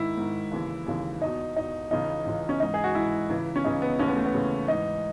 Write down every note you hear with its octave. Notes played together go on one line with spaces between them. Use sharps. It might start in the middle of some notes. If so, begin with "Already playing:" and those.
Already playing: G#2 D#3 E4
G#2 D#3
D#2 C#3 E3
D#2 C#3 E3
E2 B2 D#4
E2 B2 D#4
C#2 C#3 E3 D#4
C#2 C#3 E3
C#4
G#2 E3 D#4
G#4
F#4
G#2 E3 E4
C#2 C#3 E3
C#4
C#2 C#3 E3 D#4
B3
D#2 C#3 E3 C#4
B3
A3
B3
D#2 C#3 E3
G#2 E3 D#4